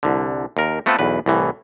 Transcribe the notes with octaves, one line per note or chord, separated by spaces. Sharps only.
C2 D3
D#2 A#4
A3 B3 C4 F4 A4 B4
B1 E2 B4
C2 A2 E3